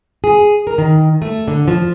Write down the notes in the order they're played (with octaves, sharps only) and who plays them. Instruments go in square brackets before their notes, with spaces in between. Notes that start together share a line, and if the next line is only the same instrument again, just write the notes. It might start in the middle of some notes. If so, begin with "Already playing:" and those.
[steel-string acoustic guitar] G#4
A#4
D#3
A3
D3
F3